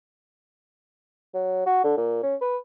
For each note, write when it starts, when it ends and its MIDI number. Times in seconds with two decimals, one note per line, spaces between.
1.34 1.64 54
1.66 1.81 66
1.83 1.96 50
1.97 2.20 46
2.23 2.35 61
2.41 2.57 71